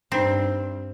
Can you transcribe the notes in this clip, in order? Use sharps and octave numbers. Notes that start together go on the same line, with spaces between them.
G2 C4 D4 D#4